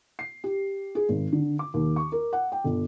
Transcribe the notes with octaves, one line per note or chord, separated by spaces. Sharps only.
C7
G4
G#4
G#1
D3
D6
D#2
C#6
A#4
F#5
G5
G1